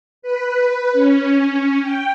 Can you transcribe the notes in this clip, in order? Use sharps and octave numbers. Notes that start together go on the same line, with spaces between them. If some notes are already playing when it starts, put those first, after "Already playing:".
B4
C#4
G5